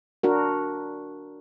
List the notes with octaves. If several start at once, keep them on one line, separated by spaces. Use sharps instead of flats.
D4 F#4 A#4